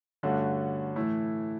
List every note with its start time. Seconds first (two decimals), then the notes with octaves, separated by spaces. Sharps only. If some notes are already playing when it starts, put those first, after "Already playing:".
0.23 G2 D3 A3 C#4 F#4
0.96 A2 E3 A3 E4